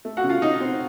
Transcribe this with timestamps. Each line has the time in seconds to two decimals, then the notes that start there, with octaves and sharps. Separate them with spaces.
0.05 A3
0.17 F#4 F#5
0.24 C#3
0.29 F4 F5
0.42 C#3 D#4 D#5
0.61 C4